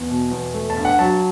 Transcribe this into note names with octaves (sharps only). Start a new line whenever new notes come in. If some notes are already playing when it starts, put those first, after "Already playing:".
Already playing: E2
B2
E2
A3
A5
G2
F#5
F#3 A5